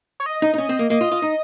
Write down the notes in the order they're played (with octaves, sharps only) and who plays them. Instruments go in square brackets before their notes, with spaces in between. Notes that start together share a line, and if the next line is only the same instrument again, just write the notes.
[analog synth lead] C#5
D#5
[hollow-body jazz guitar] D#4
D#4
C#4
C4
A#3
[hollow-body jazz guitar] A#3 [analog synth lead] D#5
[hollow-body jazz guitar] F4
F4
D#4